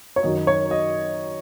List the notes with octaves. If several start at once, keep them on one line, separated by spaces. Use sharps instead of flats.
C#5
F#2 D#3 F#3 D#5
C#5
D#5